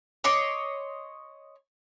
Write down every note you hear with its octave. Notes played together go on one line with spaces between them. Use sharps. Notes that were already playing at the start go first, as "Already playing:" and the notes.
C#5 D#5 C6 D6